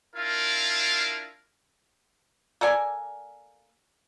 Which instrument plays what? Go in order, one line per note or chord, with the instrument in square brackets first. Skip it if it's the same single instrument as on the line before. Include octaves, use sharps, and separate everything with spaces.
[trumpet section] D4 E4 F4 A#4 F5
[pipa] A#3 A4 D5 G#5